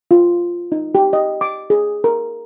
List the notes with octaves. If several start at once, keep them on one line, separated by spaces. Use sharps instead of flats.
F4
D#4
G4
D#5
D6
G#4
A#4